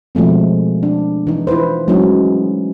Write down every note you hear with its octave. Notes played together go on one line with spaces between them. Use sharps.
B2 F3 G#3 A3 C4
D4
E3 D#4
E4 F4 B4 C5
F#3 G#3 A3 C#4 D#4 E4